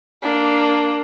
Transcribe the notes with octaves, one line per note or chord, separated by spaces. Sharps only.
A#3 D4